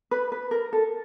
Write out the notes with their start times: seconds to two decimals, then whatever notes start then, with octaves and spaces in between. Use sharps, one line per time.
0.11 B4
0.32 B4
0.51 A#4
0.73 A4